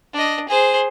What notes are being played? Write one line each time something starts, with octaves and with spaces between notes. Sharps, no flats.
D4 D#5
G#4 C5